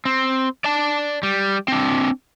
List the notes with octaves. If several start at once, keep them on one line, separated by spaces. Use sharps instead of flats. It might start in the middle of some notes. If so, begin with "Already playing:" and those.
C4
D5 A5
G3
C4 D4